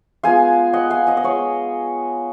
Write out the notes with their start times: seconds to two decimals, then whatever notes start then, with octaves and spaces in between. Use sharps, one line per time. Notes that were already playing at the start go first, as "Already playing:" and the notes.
0.23 G#3 B3 F4 F5 G#5
0.73 D#5 F#5
0.90 F5 G#5
1.07 D#5 F#5
1.17 D#5
1.23 G#3 B3 F4 C#5 F5